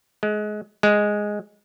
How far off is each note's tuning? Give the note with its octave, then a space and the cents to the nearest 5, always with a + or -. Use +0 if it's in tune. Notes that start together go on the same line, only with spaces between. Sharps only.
G#3 +25
G#3 +0